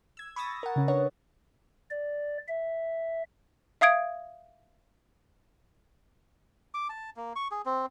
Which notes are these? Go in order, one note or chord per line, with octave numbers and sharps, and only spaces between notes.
E6 G#6
B5 C#6 D#6 E6 A6 A#6
A#4 F#5
C#3 C#4
D4 B4 C#5 F#5
D5
E5
E5 F5 D#6 G#6 D7
D6
A5
A#3
C#6
G#4
C4